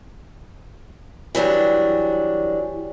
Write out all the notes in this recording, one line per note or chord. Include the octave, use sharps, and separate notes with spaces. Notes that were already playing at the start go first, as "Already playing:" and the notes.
E3 F#3 G3 D4